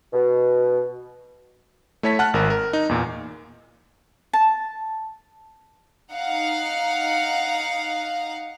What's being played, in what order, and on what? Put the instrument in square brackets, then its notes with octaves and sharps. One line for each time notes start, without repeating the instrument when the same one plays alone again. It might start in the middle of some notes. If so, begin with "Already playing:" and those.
[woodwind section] B2
[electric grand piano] A3 E4 C#5 A5 B6
F#5 A5 F6 F#6
G#1 A#4
A#4
D#4
E2 A#2
[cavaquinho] A5
[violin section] D#4 F5 F#5